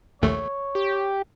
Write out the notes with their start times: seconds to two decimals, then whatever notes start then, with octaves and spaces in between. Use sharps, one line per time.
0.22 A#1 D#2 A3 C#5
0.75 G4